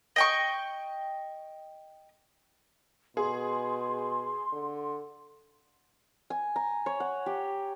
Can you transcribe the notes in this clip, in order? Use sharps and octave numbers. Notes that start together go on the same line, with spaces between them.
D#5 G5 C#6
B2 G#4 C6
D3
G#5
A#5
C#5
F#5
G4